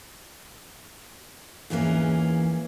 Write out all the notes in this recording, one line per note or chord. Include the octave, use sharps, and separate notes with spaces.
E2 G#2 E3 A#3 C#4